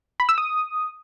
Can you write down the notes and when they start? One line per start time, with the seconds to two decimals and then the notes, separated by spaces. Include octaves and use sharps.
0.20 B5
0.29 E6
0.38 D#6